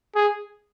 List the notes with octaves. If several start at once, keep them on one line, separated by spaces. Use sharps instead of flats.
G#4